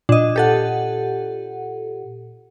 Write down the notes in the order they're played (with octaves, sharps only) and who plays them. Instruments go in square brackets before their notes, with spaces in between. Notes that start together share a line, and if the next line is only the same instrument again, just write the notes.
[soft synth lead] A#2 [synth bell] D4 D#5
[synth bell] G4 A4 F#5